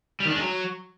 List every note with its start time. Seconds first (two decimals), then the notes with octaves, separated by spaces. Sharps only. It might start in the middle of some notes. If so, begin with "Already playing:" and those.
0.20 G3
0.25 D#3
0.30 D4
0.35 G#3
0.40 F#3